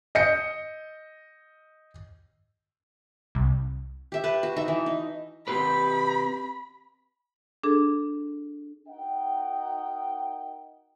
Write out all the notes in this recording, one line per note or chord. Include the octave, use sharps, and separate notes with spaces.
D#5 G6 C#7
C2
G4 E5
B4 A5
F#4
D#4 E5
E3
D#4
C4 G4 B4 B5
D4 G#4 A4
D#4 F#4 A#4 D#5 F#5 G5